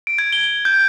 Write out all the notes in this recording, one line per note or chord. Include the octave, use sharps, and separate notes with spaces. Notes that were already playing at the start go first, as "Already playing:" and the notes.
D7
G#6
G7
G6